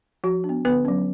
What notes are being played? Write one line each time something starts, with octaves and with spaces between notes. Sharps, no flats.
F3 F#4
D4
B3
D3 B3 B4
F#3 C#4